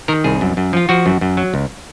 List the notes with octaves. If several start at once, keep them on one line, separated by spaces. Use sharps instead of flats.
D#3 A#4
C2 G#4
F#2
F#2
F3 F4
F3 F#4
F#2
F#2
F#3
C#2